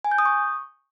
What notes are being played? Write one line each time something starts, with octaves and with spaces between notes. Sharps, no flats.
G#5
G6
D#6
C#6